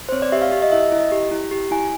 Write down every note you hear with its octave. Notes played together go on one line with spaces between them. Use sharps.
C5
C4 C#5
D5
G4 E5
F5
G4 E5
D#5
E4 E5
E5
E4 D#5
G4
E4
G4
E4 G#5